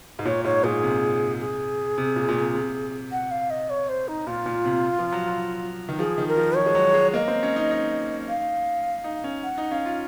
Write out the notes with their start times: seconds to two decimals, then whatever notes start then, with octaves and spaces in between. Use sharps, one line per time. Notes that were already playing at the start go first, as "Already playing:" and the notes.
0.19 G#2
0.25 A#2 C#5
0.44 G#2 C#5
0.64 A#2 G#4
0.83 C3
1.40 G#4
1.98 C3
2.16 A#2
2.28 A#2
2.35 C3
2.55 C3
3.12 F#5
3.31 F5
3.50 D#5
3.70 C#5
3.89 C5
4.08 D#4
4.27 A#2 F4
4.46 A#2
4.65 C3
4.99 F3
5.12 F#3
5.28 F#3
5.89 D#3
5.99 F3 G#4
6.18 D#3
6.28 A#4
6.37 F3
6.56 F3 C#5
6.66 G#3
6.75 F#3
6.94 G#3
7.14 A#3 D#5
7.28 C4
7.43 C#4
7.56 D#4
7.71 D#4
8.28 F5
9.04 D#4
9.24 C#4
9.43 F#5
9.58 D#4
9.71 C#4 F5
9.85 F4